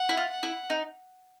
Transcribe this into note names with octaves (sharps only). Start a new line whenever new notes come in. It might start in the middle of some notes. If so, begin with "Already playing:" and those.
Already playing: F#5
E4
F4
F#5
E4
D#4